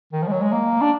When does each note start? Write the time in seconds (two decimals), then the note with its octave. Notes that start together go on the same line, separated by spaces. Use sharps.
0.12 D#3
0.23 F3
0.28 G#3
0.32 F#3
0.42 G#3
0.52 A#3
0.81 D4